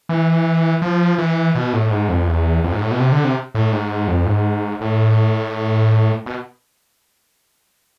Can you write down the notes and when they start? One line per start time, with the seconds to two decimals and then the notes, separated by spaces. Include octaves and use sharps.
0.09 E3
0.82 F3
1.18 E3
1.55 B2
1.73 A2
1.91 G#2
2.09 F2
2.28 E2
2.64 F2
2.72 G#2
2.81 A2
2.91 B2
3.00 C3
3.12 D3
3.24 C3
3.55 A2
3.72 G#2
4.08 F2
4.26 G#2
4.81 A2
6.26 B2